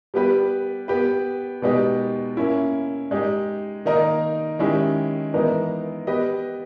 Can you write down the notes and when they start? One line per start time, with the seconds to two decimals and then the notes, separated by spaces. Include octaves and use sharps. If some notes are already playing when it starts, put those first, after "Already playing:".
0.14 G3 B3 G4 B4
0.88 B3 G4 B4
1.62 B2 G#3 B3 D#4 G4
2.37 A#3 C#4 E4
3.11 G#3 D#4 G4
3.85 D#3 A#3 D#4 A#4
4.59 D#3 G#3 C#4 E4 G4
5.34 E3 G#3 B3 D#4 A#4
6.07 B3 G4 B4 D#5